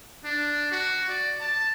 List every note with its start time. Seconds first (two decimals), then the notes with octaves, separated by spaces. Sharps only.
0.25 D4
0.72 F#4
1.09 D5
1.41 A5